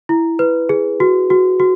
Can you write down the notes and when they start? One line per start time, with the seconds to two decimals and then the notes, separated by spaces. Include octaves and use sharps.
0.09 E4
0.39 B4
0.69 G#4
1.00 F#4
1.30 F#4
1.60 F#4